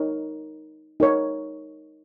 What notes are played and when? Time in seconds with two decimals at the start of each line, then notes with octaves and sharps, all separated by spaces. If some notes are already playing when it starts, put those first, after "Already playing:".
Already playing: D#4 A#4 C#5
1.00 D#4 A#4 C#5